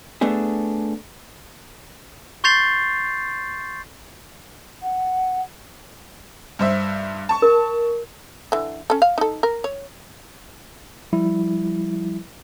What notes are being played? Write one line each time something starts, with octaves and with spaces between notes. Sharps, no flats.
A3 B3 D4 G#4
C6 C#6 G6 A6 C7 F7
F#5
G2 C5 E5
A5 C#6
A#4
D3 E3
C#4 A4
F5
D#4 A4
A#4
C#5
F3 G3 E4